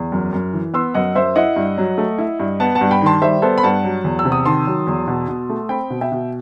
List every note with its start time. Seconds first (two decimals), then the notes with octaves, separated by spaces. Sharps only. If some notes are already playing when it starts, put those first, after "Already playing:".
Already playing: E2
0.12 F#2
0.33 F#2
0.54 E3
0.74 B3 C6 E6
0.94 F#2 D#5 F#5
1.15 F#2 C5 E5
1.36 E4 D#5 F#5
1.56 G2
1.78 F#3
1.98 A3
2.18 E4
2.40 G2
2.60 B3 F#5 A5
2.75 F#5 A5
2.81 G2
2.91 G5 B5
3.02 D#3 A5 C6
3.22 G3 C5 E5
3.42 B3 A4 C5
3.58 B5
3.63 G2 F#5 A5
3.84 F#3
4.04 E2
4.19 E6
4.25 C3
4.32 D#6
4.46 D#3 A5 C6
4.67 F#3
4.87 E2
5.08 B2
5.28 B2
5.50 A3
5.69 C4 G5 B5
5.90 B2
6.01 E5 G5
6.12 B2